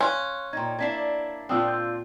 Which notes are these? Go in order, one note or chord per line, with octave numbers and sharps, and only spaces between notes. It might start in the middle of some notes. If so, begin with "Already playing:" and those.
C#4 F5 C6 F#6
A#2 D#4 G5 G#6
A#3 D4 E4 G#6 B6 C7
A#2 C4 D4 F4 F#5 G5 D#6 E6
E6 G6